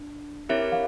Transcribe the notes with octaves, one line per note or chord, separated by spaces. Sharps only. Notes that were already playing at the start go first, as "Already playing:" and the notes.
Already playing: D4
C4 E4 G4 A#4 C#5 E5
F5